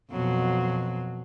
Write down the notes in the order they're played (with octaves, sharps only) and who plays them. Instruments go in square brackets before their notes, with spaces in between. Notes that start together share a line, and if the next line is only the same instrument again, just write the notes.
[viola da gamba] F2 B2 F#3